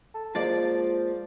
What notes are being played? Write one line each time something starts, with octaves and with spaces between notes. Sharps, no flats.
A4
F3 G#3 A#3 F4 D5 A6